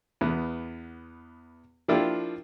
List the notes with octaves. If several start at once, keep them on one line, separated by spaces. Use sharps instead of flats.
E2 B3
F3 A#3 D4 E4 F4 G4